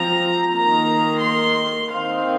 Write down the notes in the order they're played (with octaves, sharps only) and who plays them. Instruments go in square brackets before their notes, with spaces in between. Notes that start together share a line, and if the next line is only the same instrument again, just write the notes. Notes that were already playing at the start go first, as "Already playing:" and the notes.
Already playing: [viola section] F3 C4 A#5
D#3 A#3 A#5
C6
D#3 C4 F5